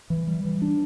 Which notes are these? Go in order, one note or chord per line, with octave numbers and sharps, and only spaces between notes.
E3
G3
E3
D4